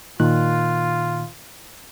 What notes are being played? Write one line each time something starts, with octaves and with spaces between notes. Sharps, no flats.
A#2 D#3 F4 F#6